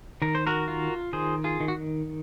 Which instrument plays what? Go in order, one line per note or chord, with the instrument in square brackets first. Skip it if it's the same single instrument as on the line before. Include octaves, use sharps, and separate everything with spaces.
[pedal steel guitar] D#3 A#4
C5
F#4 A#4
F4
D#3 G#4 C5
F4 G#4
D#3
F#4